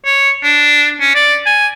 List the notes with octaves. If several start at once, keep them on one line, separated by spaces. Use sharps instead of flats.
C#5
D4
C#4
D5
G#5